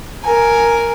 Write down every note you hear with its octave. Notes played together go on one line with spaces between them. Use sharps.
A#4 G#5